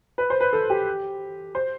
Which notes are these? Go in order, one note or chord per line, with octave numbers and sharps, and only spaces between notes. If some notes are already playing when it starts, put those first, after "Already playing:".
B4
C5
B4
A4
G4
C5